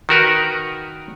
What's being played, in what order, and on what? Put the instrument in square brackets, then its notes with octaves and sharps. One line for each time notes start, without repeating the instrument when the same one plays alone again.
[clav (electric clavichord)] D#3 F#4 A#4 B4